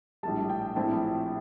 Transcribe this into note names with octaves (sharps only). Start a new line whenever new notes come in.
A#1 A2 G3 A5
G5
A#1 A2 F3 C4 E4 A5